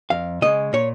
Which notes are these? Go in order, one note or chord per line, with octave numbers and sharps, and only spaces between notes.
F2 F5
C#3 G#3 D#5
A#2 C#5